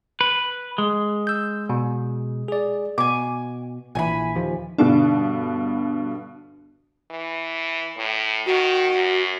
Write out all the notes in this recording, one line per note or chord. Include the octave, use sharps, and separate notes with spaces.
B4
G#3
E6 G6
B2
G#4 D5
B2 G#5 D6
A#1 D#3 E3 G#5 B5
D#2 F3
G2 B2 D3 D4
E3
A2
D#3 F#4
F#2